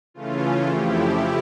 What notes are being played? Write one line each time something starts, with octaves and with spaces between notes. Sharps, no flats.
C#3 E3 A3 C#4 F4
F2 C#3 F3 A3 E4 G4